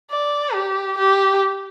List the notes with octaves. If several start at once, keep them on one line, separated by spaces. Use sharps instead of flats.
D5
G4
G4